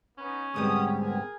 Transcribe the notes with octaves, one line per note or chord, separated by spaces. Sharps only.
B3 C#4 D#4 B4
D2 G#2 G3 B3 C4 G4 D#6
G#4 A#4 G#5